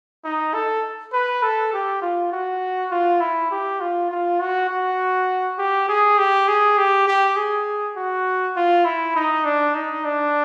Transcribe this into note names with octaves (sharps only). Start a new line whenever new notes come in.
D#4
A4
B4
A4
G4
F4
F#4
F4
E4
G4
F4
F4
F#4
F#4
G4
G#4
G4
G#4
G4
G4
G#4
F#4
F4
E4
D#4
D4
D#4
D4